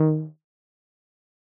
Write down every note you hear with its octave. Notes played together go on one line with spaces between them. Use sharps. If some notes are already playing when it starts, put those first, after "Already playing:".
Already playing: D#3